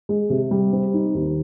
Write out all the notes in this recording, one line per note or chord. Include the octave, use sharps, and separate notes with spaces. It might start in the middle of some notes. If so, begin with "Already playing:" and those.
G#3
C3
G3
C4
D#4
D#2